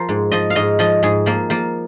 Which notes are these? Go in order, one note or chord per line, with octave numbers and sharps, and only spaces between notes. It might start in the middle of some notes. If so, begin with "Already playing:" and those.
Already playing: F3 A#4 C5
G#2
F3 D#5
F5
G#2 D#5
F3 D#5
G#2 G#4
F3 A#3
F3 A#3